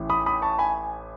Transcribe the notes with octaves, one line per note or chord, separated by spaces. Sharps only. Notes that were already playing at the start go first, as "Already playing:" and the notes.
Already playing: A1 A2 E3
B5 D#6
B5 D#6
A5 C#6
G#5 B5